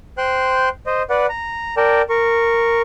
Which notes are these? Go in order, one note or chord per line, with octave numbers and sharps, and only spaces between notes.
C5 G5 C6 F#6
C5 D#5
B4 D5 F#5
A#5
A#4 D5 G5 A5
A#4 C#6